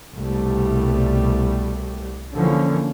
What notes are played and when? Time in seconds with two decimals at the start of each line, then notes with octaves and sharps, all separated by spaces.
0.14 C2 B2 G3 A3
2.34 D3 E3 F3 A#3 C#4